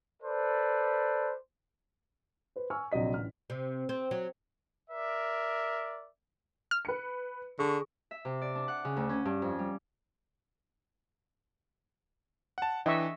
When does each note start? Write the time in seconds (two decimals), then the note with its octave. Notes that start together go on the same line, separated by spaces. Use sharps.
0.23 A4 B4 C5 D5
2.56 B4 C5
2.70 G#5 C#6 E6 F6
2.92 A#1 C3 F#3 D#5 B6
3.14 A1 F6
3.50 C3
3.89 C4
4.11 F#3
4.90 A#4 D5 E5
6.71 F6
6.85 B4 C#7
7.59 D3 G#4 C#6
8.11 E5
8.25 C3
8.42 D5
8.55 D4
8.68 F#5
8.85 C#3
8.96 D2
9.09 C#4
9.25 G2
9.42 F2
9.59 G3
12.58 F#5 A5
12.86 E3 D4 D#5 E5 G5 C#6